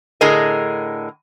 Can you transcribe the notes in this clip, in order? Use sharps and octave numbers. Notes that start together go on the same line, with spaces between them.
A2 D3 G#4 A#4 D#5